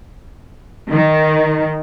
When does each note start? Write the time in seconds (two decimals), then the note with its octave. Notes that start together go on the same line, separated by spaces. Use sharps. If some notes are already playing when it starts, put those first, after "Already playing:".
0.92 D#3